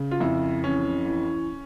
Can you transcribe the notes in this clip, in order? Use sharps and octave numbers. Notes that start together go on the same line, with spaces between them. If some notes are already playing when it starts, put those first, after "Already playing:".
Already playing: C#3
F4
F2 E4
E3 C#4
E3